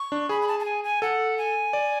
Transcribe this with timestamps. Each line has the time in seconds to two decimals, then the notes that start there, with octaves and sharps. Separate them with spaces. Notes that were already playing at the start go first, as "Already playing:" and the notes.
Already playing: C#6
0.12 D4
0.29 G#4 B5
0.42 B5
0.48 A5
0.60 A5
0.65 G#5
0.84 G#5
1.02 A4 F#5
1.38 G#5
1.73 D5